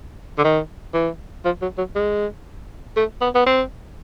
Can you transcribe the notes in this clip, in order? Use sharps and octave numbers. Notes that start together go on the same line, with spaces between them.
D3
D#3
E3
F3
F#3
F#3
G#3
A3
B3
B3
C4